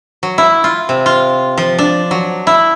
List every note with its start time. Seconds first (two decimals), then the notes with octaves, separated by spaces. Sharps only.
0.23 F#3
0.38 E4
0.64 F4
0.89 C3
1.06 F4
1.58 F3
1.78 D4
2.11 F#3
2.47 E4